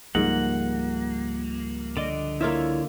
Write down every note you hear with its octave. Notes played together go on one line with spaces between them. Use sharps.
C#2 G#2 F3 G3 A#3 F#5
D3 D5 D#5
A#3 E4 F4 C#5 E5